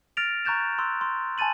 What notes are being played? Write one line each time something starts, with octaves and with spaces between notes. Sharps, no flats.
F6 A6 A#6 D7 F7
A#5 C#6 F#6 G6 A6 E7
C6 E6 F#6
C6
G#5 A5 B5 A6 D#7 F#7